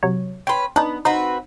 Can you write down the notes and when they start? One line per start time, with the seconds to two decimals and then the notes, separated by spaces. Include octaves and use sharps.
0.03 C3 F#3 C#5
0.47 C#4 B4 G5 C6
0.76 B3 D4 D#4
1.05 C4 D#4 F#4 B4